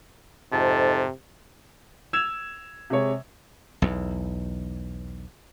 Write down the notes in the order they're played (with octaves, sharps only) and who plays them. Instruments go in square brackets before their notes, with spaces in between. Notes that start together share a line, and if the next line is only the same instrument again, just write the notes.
[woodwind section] F2 G#2 A5 [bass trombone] C3
[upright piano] E6 G#6 E7 F7
C3 G#3 C#5
[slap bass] B1 E2